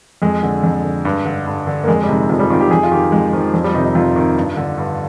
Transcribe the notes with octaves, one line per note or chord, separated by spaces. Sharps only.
F2 G#3
D3
F2
D3
G2
D3
G2
D3
A#3
F2 G#3
G3
C3 D#3 G#3
F2 F3
G3
C3 D#3 F4
G4
F2 G#4
F4
D#3 G4
F2 G#3
D#3 F3
F2 F3
G3
C3 D#3 D#4
D#4
F2 F4
C3 D#3
G2
D3
G2